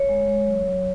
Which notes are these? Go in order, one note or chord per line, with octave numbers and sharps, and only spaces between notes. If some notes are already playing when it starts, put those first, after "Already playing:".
Already playing: C#5
G#3
G#3
F#3
F#3